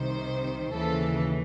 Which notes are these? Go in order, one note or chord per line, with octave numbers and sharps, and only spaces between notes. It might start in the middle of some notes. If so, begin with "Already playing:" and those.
Already playing: C2 C3 D#3 C5
D#2 C#3 E3 A4